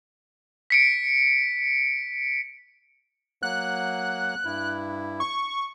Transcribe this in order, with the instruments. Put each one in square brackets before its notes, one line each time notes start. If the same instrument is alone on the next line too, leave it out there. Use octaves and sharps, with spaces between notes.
[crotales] B6 C#7 D7
[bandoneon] F#3 A#3 F#5 [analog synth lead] F#6
[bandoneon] G2 E4
[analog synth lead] C#6